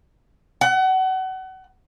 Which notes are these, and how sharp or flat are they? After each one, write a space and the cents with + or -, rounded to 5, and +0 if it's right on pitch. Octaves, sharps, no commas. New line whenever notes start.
F#5 +30